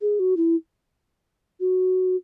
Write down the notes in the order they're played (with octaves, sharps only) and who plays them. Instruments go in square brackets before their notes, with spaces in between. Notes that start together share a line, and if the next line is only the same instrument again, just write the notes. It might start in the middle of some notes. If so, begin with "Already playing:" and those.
[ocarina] G#4
F#4
E4
F#4